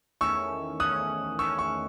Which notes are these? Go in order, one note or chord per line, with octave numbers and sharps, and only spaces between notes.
E2 D#3 A3 C#4 C#6 E6
E2 D#3 A3 C#4 D#6 F#6
E2 D#3 A3 C#4 C#6 E6
C#6 E6